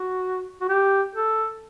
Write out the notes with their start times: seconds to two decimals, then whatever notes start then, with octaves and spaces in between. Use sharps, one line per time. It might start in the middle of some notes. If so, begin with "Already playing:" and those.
Already playing: F#4
0.61 F#4
0.69 G4
1.15 A4